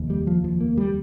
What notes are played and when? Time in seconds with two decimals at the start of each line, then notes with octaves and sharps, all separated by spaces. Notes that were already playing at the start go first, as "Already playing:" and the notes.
Already playing: F1 D#2
0.10 G3
0.27 F3
0.44 F3
0.61 A#3
0.77 G3